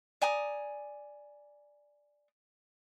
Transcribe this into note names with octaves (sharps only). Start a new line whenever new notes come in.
D5 G#5 A#5 D#6